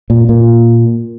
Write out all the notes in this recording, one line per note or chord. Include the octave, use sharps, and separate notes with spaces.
A#2
A#2